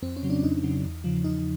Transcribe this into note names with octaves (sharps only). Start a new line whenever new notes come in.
F2 C4
C#4
C#3 F#3
D4
F2 D#4
C#3 F#3
E2
C#3 F3
E2 D#4